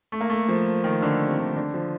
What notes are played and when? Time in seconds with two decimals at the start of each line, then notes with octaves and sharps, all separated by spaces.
0.12 A3
0.21 A#3
0.30 A3
0.49 F3
0.84 D#3
1.02 D3
1.28 C3
1.38 D3
1.56 D3
1.74 F3